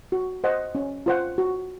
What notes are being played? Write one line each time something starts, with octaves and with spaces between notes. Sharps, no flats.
F#4
C5 D#5 F#5
C#4
F4 C5 F#5
F#4